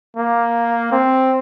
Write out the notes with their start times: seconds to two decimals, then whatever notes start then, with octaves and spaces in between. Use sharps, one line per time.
0.17 A#3
0.92 C4